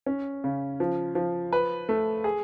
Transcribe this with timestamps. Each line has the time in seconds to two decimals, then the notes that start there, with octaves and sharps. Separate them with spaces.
0.06 C#4
0.44 C#3
0.80 F3
1.15 F3
1.53 B4
1.89 A3
2.24 G#4